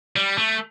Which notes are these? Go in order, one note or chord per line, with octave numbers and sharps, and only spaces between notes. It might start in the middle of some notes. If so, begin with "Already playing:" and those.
G3
A3